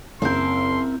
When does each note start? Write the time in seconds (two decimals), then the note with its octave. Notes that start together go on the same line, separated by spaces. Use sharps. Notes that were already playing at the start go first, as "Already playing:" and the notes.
0.22 F#1 C4 E4 A#4 C6 G6